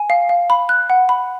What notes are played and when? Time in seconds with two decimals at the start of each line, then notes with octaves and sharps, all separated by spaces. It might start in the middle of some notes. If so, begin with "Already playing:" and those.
Already playing: G#5
0.10 F5
0.29 F5
0.50 B5
0.69 F#6
0.90 F#5
1.09 B5